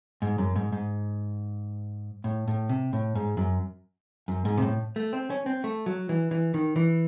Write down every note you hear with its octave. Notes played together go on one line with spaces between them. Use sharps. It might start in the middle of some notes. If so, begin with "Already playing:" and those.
G#2
F#2
G#2
G#2
A2
A2
C3
A2
G#2
F#2
F#2
G#2
C3
A2
A3
C4
C#4
C4
A3
F#3
E3
E3
D#3
E3